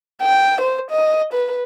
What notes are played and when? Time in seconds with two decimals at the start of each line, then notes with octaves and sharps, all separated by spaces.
0.22 G5
0.61 C5
0.91 D#5
1.33 B4